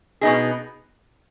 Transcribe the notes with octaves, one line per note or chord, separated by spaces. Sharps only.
B2 B3 D#4 G#4